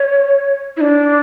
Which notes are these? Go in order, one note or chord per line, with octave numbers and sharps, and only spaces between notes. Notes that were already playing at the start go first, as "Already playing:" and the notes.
Already playing: C#5
E4
D4